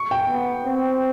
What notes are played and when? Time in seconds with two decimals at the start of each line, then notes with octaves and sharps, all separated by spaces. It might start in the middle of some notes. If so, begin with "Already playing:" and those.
Already playing: C#6
0.11 G5
0.29 B3
0.65 C4